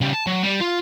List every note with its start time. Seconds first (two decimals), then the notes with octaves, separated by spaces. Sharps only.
0.01 C#3 G3
0.13 A5
0.27 F#3
0.44 G3
0.61 F4